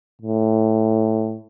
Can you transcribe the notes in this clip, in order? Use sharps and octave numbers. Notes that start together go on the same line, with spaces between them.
A2